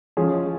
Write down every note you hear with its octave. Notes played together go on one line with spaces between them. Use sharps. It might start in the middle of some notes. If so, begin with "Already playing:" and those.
F3 G#3 C#4 G#4